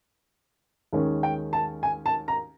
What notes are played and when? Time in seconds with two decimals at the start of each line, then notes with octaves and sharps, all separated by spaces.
0.93 D#2 D#3 G#3 C#4
1.23 G5
1.53 A5
1.83 G#5
2.06 A5
2.28 A#5